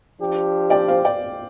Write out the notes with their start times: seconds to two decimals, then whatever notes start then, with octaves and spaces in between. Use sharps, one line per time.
0.20 F3 D4 G4
0.70 D5 G5
0.88 C5 F5
1.05 D5 G5